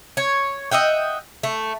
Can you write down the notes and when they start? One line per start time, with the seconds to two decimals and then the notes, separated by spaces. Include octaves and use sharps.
0.17 C#5
0.71 D#5 E5 F#5 G5
1.43 A3